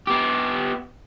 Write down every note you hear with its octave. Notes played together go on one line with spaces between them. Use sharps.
B3 G4